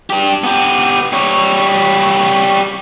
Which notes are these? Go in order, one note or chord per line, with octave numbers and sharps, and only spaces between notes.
D4 G4
B3 G4
G3 C#5